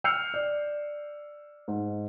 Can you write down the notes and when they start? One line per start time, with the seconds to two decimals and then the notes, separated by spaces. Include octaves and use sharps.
0.04 E6 F6 G6 C7 C#7 F7
0.34 D5
1.68 G#2